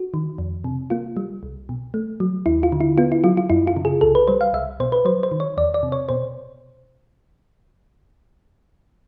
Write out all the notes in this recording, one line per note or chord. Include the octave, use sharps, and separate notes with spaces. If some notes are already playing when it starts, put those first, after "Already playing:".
Already playing: F#4
D#3
F2
C3
A#3 F4
G3
C2
B2
A3
F#3
D#2 E4
F4
D3
E4
B3 F4
E4
F#3 F4
F4
F#2 E4
F4
C#3
G#4
C2 A4
B4
G3 C5
F5
C2 E5
B2 C5
B4
F#3 C5
C5
D#3
C#5
E2 D5
D5
C3
C#5
B2 C5